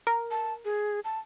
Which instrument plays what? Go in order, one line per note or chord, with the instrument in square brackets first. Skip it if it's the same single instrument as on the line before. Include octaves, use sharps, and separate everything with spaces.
[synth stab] A#4
[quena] A5
G#4
A5